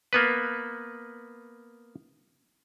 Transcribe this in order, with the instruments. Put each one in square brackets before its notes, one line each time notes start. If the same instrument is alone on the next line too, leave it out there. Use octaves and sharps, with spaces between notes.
[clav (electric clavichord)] A#3 B3 B4